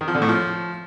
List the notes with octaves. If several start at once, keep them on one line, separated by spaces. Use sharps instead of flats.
D#3
F3
D3
A2
F3